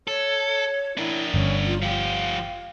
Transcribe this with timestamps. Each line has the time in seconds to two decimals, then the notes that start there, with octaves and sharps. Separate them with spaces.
0.08 A4 C#5
0.97 D4 E4 A#4
1.34 G1 C#4
1.67 F4
1.82 F3 G4 F5